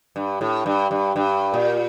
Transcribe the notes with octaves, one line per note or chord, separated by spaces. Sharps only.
G2
A2
G2
G2
G2
A#2